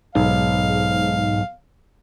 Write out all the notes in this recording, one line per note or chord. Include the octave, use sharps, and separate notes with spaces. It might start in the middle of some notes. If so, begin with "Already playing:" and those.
B1 G#2 F5